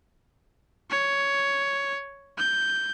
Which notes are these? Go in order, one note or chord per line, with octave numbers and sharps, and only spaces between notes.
C#5
G6